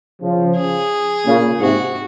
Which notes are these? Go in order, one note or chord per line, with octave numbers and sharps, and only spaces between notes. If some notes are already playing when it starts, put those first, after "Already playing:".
C#3 F3
G#4
A#2 C#3
G#2 C3 F#4